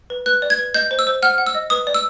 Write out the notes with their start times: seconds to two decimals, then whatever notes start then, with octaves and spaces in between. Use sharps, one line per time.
0.10 B4
0.26 B4 F#6
0.42 D5
0.50 G#6
0.59 B4
0.74 D#5 G6
0.91 C5
0.99 E6
1.07 C5
1.22 F#5 F6
1.38 F#5
1.46 E6
1.55 D#5
1.70 B4 D#6
1.87 D5
1.94 E6